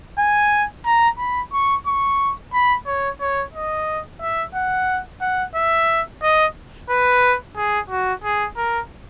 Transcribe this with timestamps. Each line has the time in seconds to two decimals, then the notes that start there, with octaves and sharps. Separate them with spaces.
0.18 G#5
0.86 A#5
1.18 B5
1.53 C#6
1.87 C#6
2.53 B5
2.86 C#5
3.21 C#5
3.54 D#5
4.21 E5
4.55 F#5
5.21 F#5
5.55 E5
6.23 D#5
6.90 B4
7.57 G#4
7.90 F#4
8.24 G#4
8.57 A#4